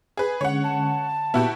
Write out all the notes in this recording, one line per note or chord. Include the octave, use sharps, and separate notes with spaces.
G#4 B4
D3 G#3 C#4 C#5 F#5
A5
A#2 B3 E4 F#4 G4